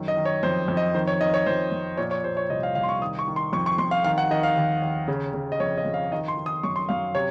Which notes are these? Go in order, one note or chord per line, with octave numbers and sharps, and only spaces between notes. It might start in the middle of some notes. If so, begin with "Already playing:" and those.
Already playing: F#2 D#3
D#5
D#3
C#5
F2 C5
F2
D#5
D#3 C5
C#5
D#3 D#5
C#5
F2 C5
F2
A#2 C#5
C#5
A#2 C5
C#5
C2 D#5
F5
C2 F5
C6
C#6
D#3 D#6
C#6
D#3
C6
F2 C#6
C#6
F2 C6
F5
D#3 F5
F#5
D#3 D#5
F5
D#2
D#2
C#3
C#3
D#5
F2 C#5
D#5
F2
F5
D#3 D#5
C6
D#3
D#6
F#2 C#6
C6
F#2 F5
C3 C#5